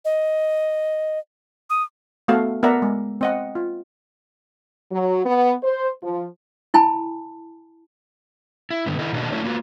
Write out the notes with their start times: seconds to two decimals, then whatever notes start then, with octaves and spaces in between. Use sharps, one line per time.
0.05 D#5
1.70 D#6
2.28 A3 B3 F#4 A4 F5
2.63 B3 A#4 D5 E5 F#5 A#5
2.82 G#3
3.21 C4 D#5 F#5
3.55 F4
4.92 F#3
5.25 B3
5.64 C5
6.03 F3
6.74 E4 G#5 A5 B5
8.71 E4
8.86 G2 D3 D#3 B3
8.98 D#3 E4 A4 D#5
9.13 B2 D#3 A#3 D4 F#4 D#5
9.32 F#3 A3 C#4 D4 E4 F#4
9.44 A#3 F4 F#4